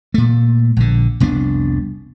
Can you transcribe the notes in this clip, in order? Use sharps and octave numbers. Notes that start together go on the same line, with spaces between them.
A#2 A3
A#1 D3
F1 C2 B3 D4